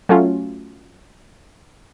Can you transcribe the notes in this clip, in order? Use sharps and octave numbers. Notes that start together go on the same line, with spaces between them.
F#3 A3 C#4 F4